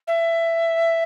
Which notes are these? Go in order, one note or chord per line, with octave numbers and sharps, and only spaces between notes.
E5